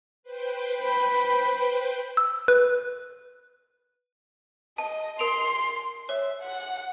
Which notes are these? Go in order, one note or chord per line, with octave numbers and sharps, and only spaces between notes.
B4 C5 G5
B5
E6
B4
D#5 A5
A#4 C6 D7 F7
C#5 E5
F#5